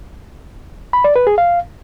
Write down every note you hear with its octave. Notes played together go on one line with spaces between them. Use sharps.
B5
D5
B4
G#4
F5